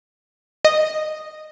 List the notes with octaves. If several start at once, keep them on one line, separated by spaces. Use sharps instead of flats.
D#5